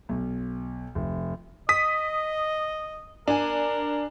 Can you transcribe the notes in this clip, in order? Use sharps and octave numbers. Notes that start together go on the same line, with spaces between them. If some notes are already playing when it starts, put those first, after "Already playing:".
B1
F1
D#5 D#6 B6
D4 A#4 G#5